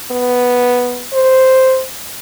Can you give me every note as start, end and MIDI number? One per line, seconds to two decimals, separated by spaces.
0.11 1.05 59
1.13 1.83 72